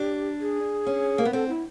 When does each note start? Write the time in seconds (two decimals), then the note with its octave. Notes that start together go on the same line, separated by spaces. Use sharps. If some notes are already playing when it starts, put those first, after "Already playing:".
Already playing: D4 G4
0.40 G#4
0.86 C#4
1.18 A#3
1.25 B3
1.33 C4 A4
1.49 E4